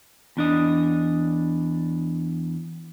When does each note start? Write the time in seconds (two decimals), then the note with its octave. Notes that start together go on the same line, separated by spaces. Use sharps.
0.37 E2 D4 D#5